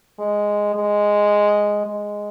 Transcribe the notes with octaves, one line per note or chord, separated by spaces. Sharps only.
G#3
G#3
G#3